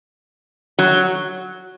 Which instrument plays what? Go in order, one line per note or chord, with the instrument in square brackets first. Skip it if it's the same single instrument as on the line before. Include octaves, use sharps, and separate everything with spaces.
[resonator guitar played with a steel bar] F#3